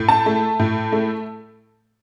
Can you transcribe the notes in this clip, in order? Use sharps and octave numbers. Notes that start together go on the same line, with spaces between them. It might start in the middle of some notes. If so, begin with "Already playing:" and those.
Already playing: A2
A5
A3
A2
A3